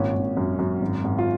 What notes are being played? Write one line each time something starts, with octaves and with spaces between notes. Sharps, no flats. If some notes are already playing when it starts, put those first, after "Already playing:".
Already playing: G#1 A#2 C#4
G#1
F#2
F#2
G#1
G#1
F4